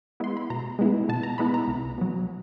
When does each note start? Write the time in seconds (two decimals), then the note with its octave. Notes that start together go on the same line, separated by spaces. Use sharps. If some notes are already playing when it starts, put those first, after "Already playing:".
0.20 G#3 B3 E4 C6
0.37 B5
0.50 B2 A#5
0.79 G#3 B3 E4
1.09 B2 A5
1.23 A#5
1.38 G#3 B3 E4 B5
1.54 A#5
1.68 C2
1.98 B2 F#3